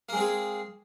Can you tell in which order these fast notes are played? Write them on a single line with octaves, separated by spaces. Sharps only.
A#3 G#3 C4 G#4